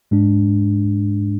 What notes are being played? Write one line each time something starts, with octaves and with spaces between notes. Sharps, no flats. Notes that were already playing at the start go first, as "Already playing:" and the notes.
G#2 G#3 D4